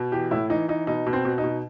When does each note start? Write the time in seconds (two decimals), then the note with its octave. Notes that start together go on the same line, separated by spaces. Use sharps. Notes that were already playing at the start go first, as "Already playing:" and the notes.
Already playing: B2
0.12 E3 G4
0.31 A2 E4
0.50 E3 D#4
0.69 E3 D#4
0.87 B2 D#4
1.07 B2
1.13 C4
1.25 B2
1.38 D#4
1.44 B2